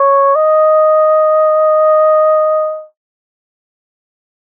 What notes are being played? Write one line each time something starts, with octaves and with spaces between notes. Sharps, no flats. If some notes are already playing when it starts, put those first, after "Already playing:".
Already playing: C#5
D#5